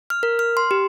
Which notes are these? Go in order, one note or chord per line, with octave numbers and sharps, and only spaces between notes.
F6
A#4
F6
C6
G4